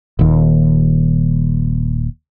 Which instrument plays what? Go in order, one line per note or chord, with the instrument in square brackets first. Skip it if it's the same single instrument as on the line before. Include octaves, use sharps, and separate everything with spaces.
[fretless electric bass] D#1 D#2